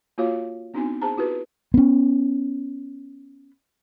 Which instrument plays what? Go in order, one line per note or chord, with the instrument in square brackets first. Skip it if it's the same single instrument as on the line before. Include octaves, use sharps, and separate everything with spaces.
[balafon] A#3 F4 F#4 C#5 F5
B3 C4 D4 D#4 F#4 G#5
G#4 C5 A5 A#5
E4 F#4 G4 B4
[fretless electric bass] B3 C#4